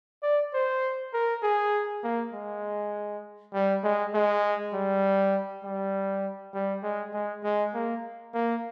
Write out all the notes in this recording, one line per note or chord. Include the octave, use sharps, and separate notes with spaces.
D5
C5
A#4
G#4
A#3
G#3
G3
G#3
G#3
G3
G3
G3
G#3
G#3
G#3
A#3
A#3